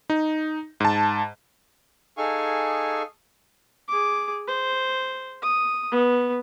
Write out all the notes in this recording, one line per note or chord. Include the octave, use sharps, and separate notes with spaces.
D#4
G#2 A5
D#4 G#4 A4 F5 G#5 C#6
G#4 D6
C5
D#6
B3